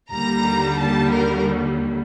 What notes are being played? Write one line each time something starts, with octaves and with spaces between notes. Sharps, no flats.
D#2 D3 G3 A#3 A#5
A5
A#4